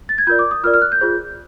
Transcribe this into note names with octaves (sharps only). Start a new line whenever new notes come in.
A6
G#6
F4 A#4 D5 G6
D6
D#6
F4 A#4 D5 F6
F6
F#6
G6
F4 G#4 C5